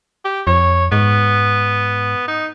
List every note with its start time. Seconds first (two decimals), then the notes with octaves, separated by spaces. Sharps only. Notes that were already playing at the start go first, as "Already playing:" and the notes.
0.25 G4
0.47 F2 C#5
0.92 G#2 B3
2.28 D#4